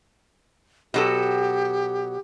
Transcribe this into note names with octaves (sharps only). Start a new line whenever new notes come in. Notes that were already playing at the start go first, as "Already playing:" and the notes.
B2 F#3 G4 A4